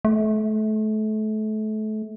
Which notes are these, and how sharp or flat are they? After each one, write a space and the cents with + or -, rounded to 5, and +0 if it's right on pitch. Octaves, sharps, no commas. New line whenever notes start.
A3 -30